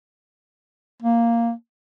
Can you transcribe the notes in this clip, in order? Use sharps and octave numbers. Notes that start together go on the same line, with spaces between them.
A#3